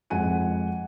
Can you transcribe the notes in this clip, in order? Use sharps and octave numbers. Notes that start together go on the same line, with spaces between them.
F2 G#3 F#5 G#5 D#7